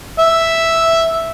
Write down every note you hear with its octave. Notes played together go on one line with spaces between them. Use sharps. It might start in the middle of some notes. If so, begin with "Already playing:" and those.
E5